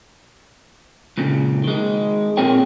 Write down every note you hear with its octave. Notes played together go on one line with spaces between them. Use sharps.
C#2 A#2 C#3
D#3 G#3
A#2 C4 G#4 A#4 C#5 G5